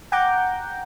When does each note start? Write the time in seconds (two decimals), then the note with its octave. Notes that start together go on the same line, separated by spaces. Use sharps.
0.12 F#5 G5 A#5 D6 G6